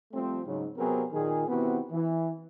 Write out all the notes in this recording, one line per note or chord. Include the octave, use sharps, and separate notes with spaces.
F3 G3 A3 C4
G#2 C#3 F#3
C3 F#3 B3 C4 G#4 A#4
A#2 D#3 G#4
C3 E3 B3 C4 E4 F#4
E3